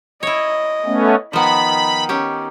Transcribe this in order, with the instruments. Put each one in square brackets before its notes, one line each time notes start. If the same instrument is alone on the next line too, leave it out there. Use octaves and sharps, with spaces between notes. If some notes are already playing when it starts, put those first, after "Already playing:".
[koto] E4 C#5 [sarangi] D#5
[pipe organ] A3 B3 C#4
[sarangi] D#3 [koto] F3 B3 [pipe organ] B5
[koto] C#4 G4